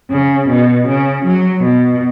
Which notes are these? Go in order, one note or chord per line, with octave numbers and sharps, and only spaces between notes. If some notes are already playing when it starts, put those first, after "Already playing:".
C#3
B2
C#3
F#3
B2